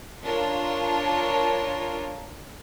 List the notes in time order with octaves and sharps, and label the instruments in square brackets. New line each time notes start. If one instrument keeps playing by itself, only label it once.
[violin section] D4 F4 A#4 C#5 A5